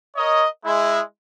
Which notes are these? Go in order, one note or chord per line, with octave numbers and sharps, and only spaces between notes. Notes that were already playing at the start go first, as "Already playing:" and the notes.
A#4 C#5 D#5
G#3 E4